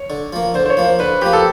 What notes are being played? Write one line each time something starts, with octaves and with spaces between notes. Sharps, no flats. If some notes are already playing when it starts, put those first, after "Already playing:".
Already playing: C#5
D3
F3 A#3
D3 C5
C5
C#5
F3 A#3
C5
D3 B4
F3 A#3 G4
A4